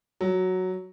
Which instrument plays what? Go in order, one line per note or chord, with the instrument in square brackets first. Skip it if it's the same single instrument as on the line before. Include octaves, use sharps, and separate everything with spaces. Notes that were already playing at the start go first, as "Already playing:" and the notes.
[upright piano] F#3